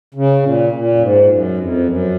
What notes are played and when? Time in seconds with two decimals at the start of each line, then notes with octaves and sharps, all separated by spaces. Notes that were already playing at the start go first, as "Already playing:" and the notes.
0.14 C#3
0.43 A#2
0.72 A#2
0.95 F#2
1.00 G#2
1.29 F#2
1.57 F2
1.86 F#2